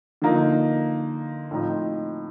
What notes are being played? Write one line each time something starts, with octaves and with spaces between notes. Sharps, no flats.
D3 F3 A#3 D#4
A2 F3 C4 D#4